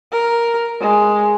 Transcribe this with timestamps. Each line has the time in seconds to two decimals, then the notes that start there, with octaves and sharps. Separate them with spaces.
0.12 A#4
0.80 G#3